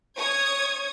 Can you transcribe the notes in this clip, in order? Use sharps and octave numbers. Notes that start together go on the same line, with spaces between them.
C#5 D#6 G#6